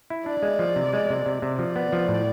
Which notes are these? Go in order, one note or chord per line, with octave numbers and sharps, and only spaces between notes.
E4
D4 D5
G#3
F3
C3
G#3
C3
C3
C3
F3 D5
B3
F3
A2